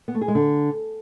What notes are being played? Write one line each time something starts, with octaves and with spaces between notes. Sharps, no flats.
B3
A3
G#4
G#3
D3